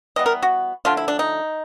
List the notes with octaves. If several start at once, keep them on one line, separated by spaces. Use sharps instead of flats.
E3 G3 B3 D#5
A#4
F#4
D3 F3 A3 F4
E4
D4
D#4